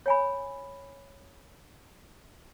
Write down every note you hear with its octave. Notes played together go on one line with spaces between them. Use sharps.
C#5 G#5 B5